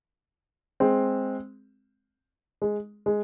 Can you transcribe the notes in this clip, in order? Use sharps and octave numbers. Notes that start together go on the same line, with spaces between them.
G#3 C4
G#3
G#3